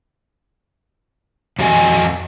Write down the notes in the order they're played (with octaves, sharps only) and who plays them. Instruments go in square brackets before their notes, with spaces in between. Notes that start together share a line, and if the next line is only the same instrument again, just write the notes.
[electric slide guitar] F2 F3 F#4 D#5 G#5